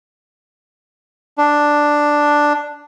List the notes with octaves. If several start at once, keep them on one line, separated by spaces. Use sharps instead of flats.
D4